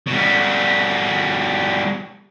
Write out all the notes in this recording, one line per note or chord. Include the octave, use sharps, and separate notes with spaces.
B2 G3